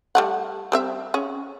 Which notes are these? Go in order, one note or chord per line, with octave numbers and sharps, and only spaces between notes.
G3 A3 F#5
G3 C4 E5
C#4 G#4